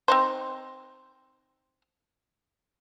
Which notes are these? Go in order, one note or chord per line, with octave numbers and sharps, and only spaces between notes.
C4 D#4 C5